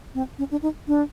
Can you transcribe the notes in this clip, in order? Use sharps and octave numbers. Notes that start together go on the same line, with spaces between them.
C4
C#4
D4
D#4
D4